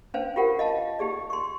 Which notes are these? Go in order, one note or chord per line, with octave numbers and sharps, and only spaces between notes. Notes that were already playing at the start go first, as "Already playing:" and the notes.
C#4 D4 B4 C5 F5 G#5
F4 G4 A#4 F#5
D#5 F5 A5
D#4 G4 G#4 D5
C6 C#6